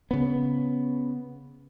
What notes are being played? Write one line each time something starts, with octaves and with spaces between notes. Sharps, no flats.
C#3 B3